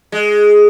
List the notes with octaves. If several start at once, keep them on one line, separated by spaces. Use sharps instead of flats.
G#3